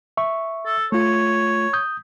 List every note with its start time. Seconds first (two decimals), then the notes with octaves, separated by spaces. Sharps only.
0.17 E5 C#6
0.66 A4
0.92 A3 F4 C#5
1.73 D#6 G6